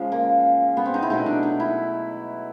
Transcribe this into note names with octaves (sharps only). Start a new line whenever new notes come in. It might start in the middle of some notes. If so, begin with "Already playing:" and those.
Already playing: C#3 F3 G#3
A#3
B3
C4
D#4
E4
B2 F#3 A3 D#4
D4
D#4
E4